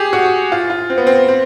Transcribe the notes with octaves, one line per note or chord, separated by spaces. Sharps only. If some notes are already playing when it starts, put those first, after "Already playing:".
Already playing: G4 G#4
F#4
F4
F4
C4
B3
C4
C4